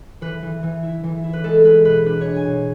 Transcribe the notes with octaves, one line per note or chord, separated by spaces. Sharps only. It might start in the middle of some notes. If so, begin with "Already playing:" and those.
E3 B4
E3
E3
E4
E3
E4
B4
G#3 A4
G#3 B4
B2 B4
D4 B4
G#3 C#5
G#5
B2